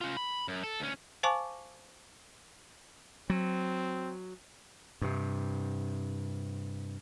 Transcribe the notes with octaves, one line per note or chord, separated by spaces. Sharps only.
C#4 F4
B5
F#2
A4
D2 C#4
C5 F5 G#5 A5 C#6 D6
F#3 C4
G2 C3